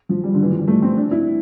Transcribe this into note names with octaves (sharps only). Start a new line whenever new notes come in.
F3
G3
D3
E3
F3
G3
A3
C4
D4
E4